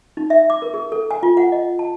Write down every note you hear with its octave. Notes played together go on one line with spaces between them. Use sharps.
D#4
E5
D6
A#4
G#4
A4
G#5
F4
F#5
D#5
A5